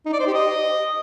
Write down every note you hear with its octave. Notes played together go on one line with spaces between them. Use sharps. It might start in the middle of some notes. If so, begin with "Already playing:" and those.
D#4
D5
C5
G4
D#5